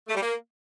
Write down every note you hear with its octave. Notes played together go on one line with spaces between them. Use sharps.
A3
G3
A#3